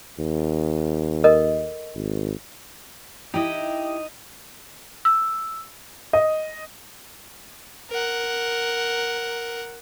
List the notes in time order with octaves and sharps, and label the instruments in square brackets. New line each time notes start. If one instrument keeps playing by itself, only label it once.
[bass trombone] D#2
[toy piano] A4 A#4 D#5
[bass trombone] G#1
[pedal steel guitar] D#4 D#5 [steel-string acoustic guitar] E4 G4
[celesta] E6
[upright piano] D#5
[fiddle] A#4 F#5